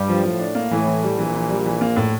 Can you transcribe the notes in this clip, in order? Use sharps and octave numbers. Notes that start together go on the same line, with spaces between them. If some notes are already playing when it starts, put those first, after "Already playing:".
Already playing: G2 G3
F3
A2 F3
D4
A#3
A2 E3
E3
G3
A#1 A#2 E3
E3
G3
E3
A#3
A2